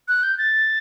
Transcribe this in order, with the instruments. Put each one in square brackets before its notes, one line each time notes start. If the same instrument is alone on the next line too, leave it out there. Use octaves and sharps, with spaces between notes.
[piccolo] F#6
G6
A6